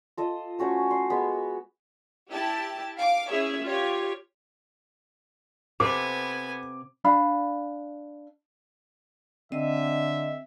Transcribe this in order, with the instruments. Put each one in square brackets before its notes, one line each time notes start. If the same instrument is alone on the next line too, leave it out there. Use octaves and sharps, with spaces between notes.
[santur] F4 A4 D#5
A3 C#4 F#4 C5
C6
G#3 B3 B5
[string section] E4 G4 A5
F5 D6
C#4 E4 G#4 C#5 E5
F4 G4 C#5
[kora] C3 [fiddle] B3 G#5 [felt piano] A4 [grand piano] D6
[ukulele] D4 F5 B5
[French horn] D3 [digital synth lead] C4 [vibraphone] D#5 [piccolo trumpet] E5